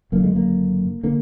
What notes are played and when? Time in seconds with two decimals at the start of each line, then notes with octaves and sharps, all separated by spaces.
0.12 F#1 F#2 D3 A#3
0.24 G#3
0.36 A#3
1.03 D3 A#3